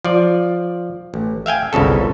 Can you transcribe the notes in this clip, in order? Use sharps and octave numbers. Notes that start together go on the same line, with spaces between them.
F3 D5
A1
E5 F5 G5 G#5
G1 C2 C#3 A4